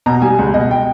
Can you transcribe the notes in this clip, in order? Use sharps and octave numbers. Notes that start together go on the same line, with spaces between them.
B2 A#5
G3 G#5
C#2
B2 D#5
G5